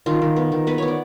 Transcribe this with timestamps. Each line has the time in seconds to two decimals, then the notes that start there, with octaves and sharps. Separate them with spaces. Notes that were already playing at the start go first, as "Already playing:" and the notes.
0.06 D#3 F4
0.22 D#3
0.36 B3
0.52 D#3
0.67 B3 B4
0.78 B3 C#5
0.88 D5